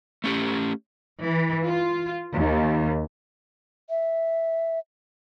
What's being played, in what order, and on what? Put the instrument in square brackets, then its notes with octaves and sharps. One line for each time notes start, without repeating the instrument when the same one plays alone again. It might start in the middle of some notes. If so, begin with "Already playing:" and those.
[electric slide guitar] A3 C#4 G4
[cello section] E3
F4
D#2
[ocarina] E5